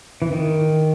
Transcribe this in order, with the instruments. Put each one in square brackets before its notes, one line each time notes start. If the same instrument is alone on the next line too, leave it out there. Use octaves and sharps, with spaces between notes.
[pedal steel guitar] E3
D#3